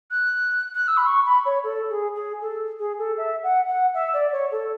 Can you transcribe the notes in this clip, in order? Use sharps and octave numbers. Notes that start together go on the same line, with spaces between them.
F#6
F#6
E6
B5
C#6
B5
C#5
A4
G#4
G#4
A4
G#4
A4
E5
F#5
F#5
E5
D5
C#5
A4